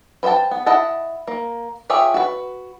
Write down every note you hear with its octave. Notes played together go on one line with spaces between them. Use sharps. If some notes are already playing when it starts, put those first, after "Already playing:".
B4 C5 D#5 G5 A5
B3
E4 D#5 F#5 A5
A#3
F4 G4 G#4 C#5 E5
F#4 B4